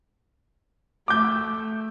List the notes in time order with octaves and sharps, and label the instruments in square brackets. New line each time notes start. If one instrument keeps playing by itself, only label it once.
[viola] A3 [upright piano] D6 G6